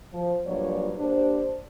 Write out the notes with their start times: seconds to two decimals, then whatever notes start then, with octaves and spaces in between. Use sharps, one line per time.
0.13 F3
0.46 G2 A#2 F3 F#3 C#5 D5
0.98 A#3 D4 G4 C5